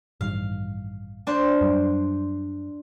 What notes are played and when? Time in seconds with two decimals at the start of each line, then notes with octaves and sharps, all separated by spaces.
0.21 A1 G2 D#3 F5
1.27 D4 C5
1.61 F#2 G3